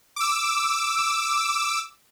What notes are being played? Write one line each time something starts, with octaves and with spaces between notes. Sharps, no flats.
D6 E6